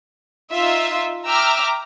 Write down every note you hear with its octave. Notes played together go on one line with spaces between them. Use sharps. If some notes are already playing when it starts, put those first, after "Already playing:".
D#4 F4 E5
E5 G5 A#5 D6 E6 F6